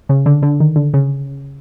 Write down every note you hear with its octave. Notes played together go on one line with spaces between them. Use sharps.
C#3
D3
D3
D#3
D3
C#3